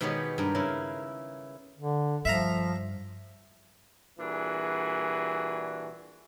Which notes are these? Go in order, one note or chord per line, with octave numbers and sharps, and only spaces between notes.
B2 D#3 G#3 B3 G4 C#5
G2 A#4
C#3 E4 A#4
D3
G2 F3 E5 F5 A#5
A#2 E3 G3 D4 F#4 G#4